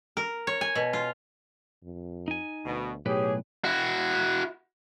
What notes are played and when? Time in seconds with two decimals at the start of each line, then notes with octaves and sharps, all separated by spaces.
0.17 A#4
0.47 C#5
0.61 G#5
0.75 B2
0.93 F4
1.83 F2
2.28 D#4 G#5
2.65 D2 B2
3.06 B1 A2 G4 G#4 B4 C#5
3.64 E4 F#4